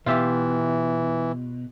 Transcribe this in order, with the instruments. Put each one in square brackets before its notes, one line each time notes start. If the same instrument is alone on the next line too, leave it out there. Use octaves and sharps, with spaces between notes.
[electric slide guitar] B2 [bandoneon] E3 [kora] F4 G4 E5